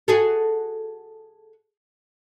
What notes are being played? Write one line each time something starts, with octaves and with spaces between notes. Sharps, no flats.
F#4 G#4 A4